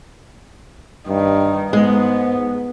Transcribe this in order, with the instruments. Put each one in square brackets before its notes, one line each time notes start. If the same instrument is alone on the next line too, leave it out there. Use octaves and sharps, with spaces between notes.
[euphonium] G2 [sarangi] D#3
[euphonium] G#2 [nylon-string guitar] G#3 [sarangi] B3